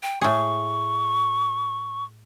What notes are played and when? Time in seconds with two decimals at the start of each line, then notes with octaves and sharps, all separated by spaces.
0.03 G5
0.21 A2 G#4 C#6